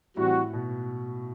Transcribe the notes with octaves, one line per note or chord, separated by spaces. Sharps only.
A2 E3 G3 C4 F#4
B2